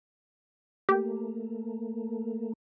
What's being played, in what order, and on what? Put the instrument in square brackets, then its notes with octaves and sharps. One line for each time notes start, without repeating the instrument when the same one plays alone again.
[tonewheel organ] A3 A#3 [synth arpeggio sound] G4